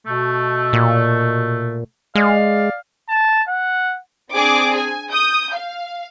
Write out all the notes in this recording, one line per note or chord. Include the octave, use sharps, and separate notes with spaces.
B2 A3
A#2
G#3 D5 F5
A5
F#5
C4 D4 G#4 D6
G#5
D#6 G6
F5